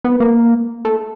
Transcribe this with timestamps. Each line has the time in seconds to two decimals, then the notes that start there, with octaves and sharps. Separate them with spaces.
0.04 B3
0.20 A#3
0.85 A3